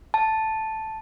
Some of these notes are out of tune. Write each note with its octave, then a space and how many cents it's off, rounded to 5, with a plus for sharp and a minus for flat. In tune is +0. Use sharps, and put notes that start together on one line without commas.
A5 +0